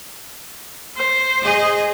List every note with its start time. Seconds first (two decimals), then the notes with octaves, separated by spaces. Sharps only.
0.97 C5
1.43 G#4 D#5